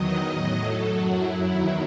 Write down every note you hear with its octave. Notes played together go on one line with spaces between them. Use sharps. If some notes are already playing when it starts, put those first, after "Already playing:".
Already playing: E2 D#3 F#3 D#5
A2 F#3
A4
F#2 F#3 F#4
E4
E2 D#3 F#3 E4